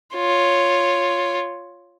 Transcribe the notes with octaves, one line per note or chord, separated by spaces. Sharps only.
F4 C#5